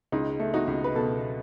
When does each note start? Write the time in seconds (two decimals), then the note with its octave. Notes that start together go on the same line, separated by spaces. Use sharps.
0.12 C#2 D#4
0.40 A3
0.54 D#4 F#4
0.67 C#2
0.84 B4
0.95 B2 F#4 A4